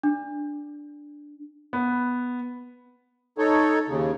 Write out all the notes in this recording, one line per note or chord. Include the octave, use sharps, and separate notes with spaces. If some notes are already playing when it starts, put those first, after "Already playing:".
D4
B3
D#4 A4 C#5
D#2 C#3